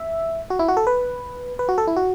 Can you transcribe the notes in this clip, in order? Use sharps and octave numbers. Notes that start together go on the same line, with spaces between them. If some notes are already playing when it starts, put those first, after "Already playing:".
Already playing: E5
F#4
E4
F#4
A4
B4
B4
F#4
A4
E4
F#4